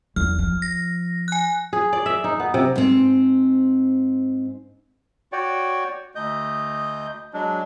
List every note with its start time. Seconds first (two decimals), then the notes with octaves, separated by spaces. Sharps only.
0.16 E2 F6
0.39 F3
0.62 A#6
1.28 G#5 F#6
1.73 G#4
1.93 D5
2.06 E5
2.24 D#4
2.40 B3
2.54 C3
2.76 G#2 C4
5.32 F#4 C#5 D5 G5
6.15 D2 D#5 G6
7.33 F#3 G#3 D4